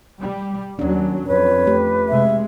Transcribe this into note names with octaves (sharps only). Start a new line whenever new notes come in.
G3
D#2 F#3 C#4 D4
F2 B4 C#5
A3 G4
C3 G#3 E5